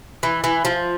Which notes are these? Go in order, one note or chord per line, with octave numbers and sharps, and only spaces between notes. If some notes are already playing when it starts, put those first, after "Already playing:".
E3
E3
F3